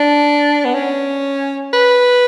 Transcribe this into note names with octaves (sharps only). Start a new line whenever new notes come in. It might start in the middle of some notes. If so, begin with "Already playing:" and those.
Already playing: D4
B3
C#4
B4